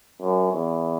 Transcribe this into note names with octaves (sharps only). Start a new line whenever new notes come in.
F#2
E2